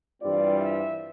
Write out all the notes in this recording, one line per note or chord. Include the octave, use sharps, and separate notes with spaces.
G2 E3 G3 C4 F4 D5
E5